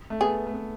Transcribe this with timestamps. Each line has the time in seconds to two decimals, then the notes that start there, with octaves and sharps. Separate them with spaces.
0.10 A3
0.21 B3 G#4
0.47 A3
0.54 B3